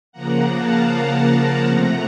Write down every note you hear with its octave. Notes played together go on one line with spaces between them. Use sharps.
C#3 F3 A#3 F#5 A#5
F5 A5
F#5 A#5
C3 F3 A3